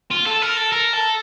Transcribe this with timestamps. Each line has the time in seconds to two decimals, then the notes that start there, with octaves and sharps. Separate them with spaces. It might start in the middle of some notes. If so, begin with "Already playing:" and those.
0.11 F4
0.26 A4
0.42 A#4
0.57 A4
0.72 A#4
0.93 A4